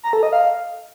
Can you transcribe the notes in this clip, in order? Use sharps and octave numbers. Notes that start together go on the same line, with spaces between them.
A#5
A4
D#5
F5